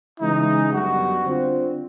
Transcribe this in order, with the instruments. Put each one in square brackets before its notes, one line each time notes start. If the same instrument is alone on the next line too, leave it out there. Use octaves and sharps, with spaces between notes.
[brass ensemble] C#3 E3 G#3 [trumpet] D#4
[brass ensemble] F#2 D3 G3 B3 [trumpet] F#4
[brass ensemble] D3 G3 C4 F4